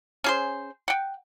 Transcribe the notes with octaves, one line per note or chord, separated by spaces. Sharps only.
C#4 G#4 C5
F#5 G5